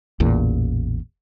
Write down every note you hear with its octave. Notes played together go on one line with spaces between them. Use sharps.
A1 E2 A#2